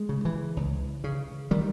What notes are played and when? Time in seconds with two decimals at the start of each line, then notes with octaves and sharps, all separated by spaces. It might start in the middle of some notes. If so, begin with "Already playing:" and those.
Already playing: G#3
0.09 C#3
0.25 E3
0.57 C#2
1.04 C#3
1.51 D#3 G3